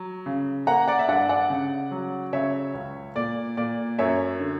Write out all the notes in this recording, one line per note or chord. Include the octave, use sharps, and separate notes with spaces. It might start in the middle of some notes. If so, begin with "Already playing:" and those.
Already playing: F#3
C#3
A#3 F#5 A#5
D5 F#5
E5
G2 D5 F#5
D5 F#5
C#3
F#3
C#3 C#5 E5
C#2
A#2 D5
A#2 D5
F#2 C#5 E5
D3